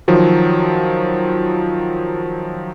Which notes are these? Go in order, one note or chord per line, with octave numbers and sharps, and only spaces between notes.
D#3 F3 F#3